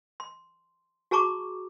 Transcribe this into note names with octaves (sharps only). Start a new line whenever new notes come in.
C6
F#4 G#4 A5 A#5 C#6 D6